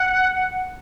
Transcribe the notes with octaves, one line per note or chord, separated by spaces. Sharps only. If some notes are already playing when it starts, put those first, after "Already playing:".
Already playing: F#5